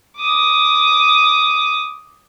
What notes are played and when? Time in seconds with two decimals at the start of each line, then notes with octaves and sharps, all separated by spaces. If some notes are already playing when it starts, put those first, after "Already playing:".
0.18 D6 D#6